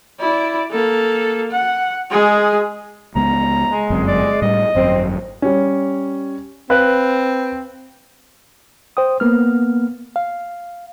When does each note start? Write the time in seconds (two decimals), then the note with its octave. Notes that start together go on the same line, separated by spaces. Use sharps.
0.19 E4 D5
0.71 A#3 A4
1.51 F#5
2.11 G#3 G#4
3.15 C#2 G#3 B3 A#5
3.71 G#3
3.90 G1 F#2 C4
4.08 D5
4.42 A2 G3 D#5
4.75 G#1 F#2 C4
5.42 G3 C#4
6.70 C4 B4 F5 F#6
8.97 C5 G5 D#6
9.20 A#3 B3 F6
10.16 F5